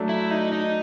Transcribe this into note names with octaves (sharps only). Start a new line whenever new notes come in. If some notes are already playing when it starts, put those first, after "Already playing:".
Already playing: F#3 A3 D4
E4
D#4
D#4